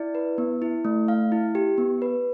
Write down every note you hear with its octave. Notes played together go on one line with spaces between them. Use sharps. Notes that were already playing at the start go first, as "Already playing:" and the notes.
Already playing: E4 D5
B4
B3
E4
A3
F5
E4
G4
B3
B4